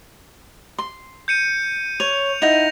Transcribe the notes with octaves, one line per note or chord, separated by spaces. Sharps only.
C6
G6 C#7 D#7
C#5 F7
D#4 E4 F#5 A#6 F7